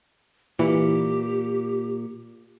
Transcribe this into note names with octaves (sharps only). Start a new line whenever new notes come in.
A#2 E3 G4